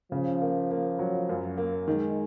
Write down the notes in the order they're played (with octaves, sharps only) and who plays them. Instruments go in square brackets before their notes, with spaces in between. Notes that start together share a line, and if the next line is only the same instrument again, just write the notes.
[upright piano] C#3 [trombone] F3
[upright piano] A#3
A#3
F#3
F#2
A#3
[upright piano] D#3 [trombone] G#3